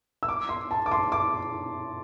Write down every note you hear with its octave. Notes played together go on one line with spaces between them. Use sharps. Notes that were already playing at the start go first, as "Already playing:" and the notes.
E6
D6
C6
A5
D6
C6
D6